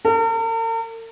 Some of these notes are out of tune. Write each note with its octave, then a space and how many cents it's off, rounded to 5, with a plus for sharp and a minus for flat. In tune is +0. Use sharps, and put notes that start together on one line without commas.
A#4 -45